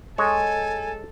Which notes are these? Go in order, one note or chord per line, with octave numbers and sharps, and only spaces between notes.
G#3 A4 C#5 G#5